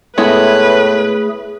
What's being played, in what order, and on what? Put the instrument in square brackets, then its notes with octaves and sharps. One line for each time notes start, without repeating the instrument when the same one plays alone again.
[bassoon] A2 [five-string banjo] G#3 B3 E4 [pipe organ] A3 G#4 [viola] B4